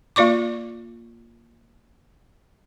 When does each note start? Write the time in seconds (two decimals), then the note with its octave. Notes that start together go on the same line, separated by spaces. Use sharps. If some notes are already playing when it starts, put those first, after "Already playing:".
0.16 A#3 F4 D5 C#6 D6